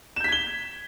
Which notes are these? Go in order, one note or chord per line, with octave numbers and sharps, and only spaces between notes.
G6 G#6 B6 E7 G7